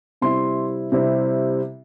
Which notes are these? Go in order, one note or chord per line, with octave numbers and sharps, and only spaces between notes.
C3 G3 C4 E4 C6
C3 G3 C4 E4